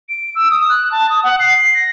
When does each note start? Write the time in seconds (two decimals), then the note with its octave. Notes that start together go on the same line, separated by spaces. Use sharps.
0.09 D7
0.35 E6
0.51 D#6
0.69 F#6
0.92 A5
1.10 D#6
1.24 F#5
1.40 C7
1.58 C7
1.74 A#6